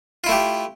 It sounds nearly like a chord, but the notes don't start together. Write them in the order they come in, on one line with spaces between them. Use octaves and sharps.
F4 E4 A3 G4